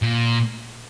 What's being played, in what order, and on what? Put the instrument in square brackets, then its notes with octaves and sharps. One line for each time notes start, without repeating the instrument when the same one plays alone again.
[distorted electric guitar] A#2